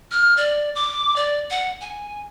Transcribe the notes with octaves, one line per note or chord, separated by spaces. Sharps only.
F6
D5
D6
D5
F#5
G#5